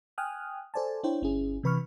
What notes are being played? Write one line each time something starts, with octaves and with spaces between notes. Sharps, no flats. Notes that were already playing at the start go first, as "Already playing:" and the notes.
G5 G#5 D#6 F6 F#6
A4 C5 D5 G#5 A5
D4 E4 C5 C#5 G5
G1 C#4 E4 G#4
C3 E3 B4 B5 C#6 F6